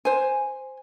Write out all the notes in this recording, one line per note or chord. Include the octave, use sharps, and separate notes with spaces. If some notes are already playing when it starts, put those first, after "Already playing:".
C5 G#5